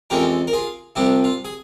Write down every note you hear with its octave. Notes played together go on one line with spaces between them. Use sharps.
F2 E3 G#3 C#4 G4 A#4
A#4
F4 G#4
C2 C3 F3 E4 G4
F4
G#4